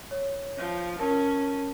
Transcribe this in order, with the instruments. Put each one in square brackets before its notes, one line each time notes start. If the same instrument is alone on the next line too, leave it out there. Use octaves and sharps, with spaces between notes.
[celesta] C#5
[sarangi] F3
[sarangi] C#4 [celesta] A#4 A5